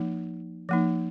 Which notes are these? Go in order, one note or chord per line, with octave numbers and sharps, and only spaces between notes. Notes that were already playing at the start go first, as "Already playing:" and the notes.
Already playing: F3 A#3 D#4
F3 A#3 D#4